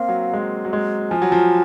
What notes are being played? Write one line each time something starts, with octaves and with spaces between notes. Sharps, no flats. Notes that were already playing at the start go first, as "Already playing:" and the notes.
Already playing: A#3 C4 F5
F#3
G#3
F#3
G#3
F3 G#5
F#3
F3